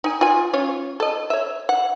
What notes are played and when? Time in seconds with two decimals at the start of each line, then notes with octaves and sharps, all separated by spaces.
0.04 D#4 G#5
0.21 F4 G#5
0.53 C#4 F4 C#5
1.00 A4 D#5
1.30 C#5 E5
1.69 F#5